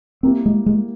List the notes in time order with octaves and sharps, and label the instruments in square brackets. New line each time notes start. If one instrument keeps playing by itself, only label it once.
[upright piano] G3 A#3 E4 G4 A#4 [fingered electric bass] C4
[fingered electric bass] G#3
G#3